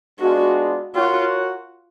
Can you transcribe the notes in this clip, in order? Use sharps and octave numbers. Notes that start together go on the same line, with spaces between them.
G#3 B3 D4 F4 F#4
F4 F#4 A#4 C#5 F#5